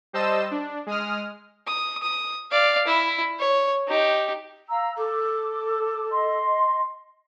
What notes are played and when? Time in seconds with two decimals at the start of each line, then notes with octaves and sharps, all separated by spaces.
0.13 G3 C5 D#5 A5 E6 E7
0.51 D4
0.86 G#3 D#6 F6
1.67 D#6
2.03 D#6
2.51 D5 F5
2.88 E4
3.40 C#5
3.88 D#4 G4
4.69 F5 A#5 E6
4.97 A4 D6
6.10 D#5 C6